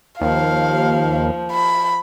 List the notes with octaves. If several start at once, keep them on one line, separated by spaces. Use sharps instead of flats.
D#2 F3 F5
B5